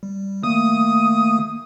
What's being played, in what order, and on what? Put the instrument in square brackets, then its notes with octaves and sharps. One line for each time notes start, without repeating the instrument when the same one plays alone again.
[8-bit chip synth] G3
[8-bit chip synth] D#3 A3 A#3 [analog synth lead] D#6